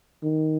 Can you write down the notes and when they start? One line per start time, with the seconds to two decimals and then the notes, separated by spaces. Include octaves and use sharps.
0.23 D#3